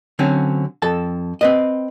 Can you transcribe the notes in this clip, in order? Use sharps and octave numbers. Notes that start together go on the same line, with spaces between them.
D3 F#3 C4 C#4
F2 A4 A5
C4 B4 D#5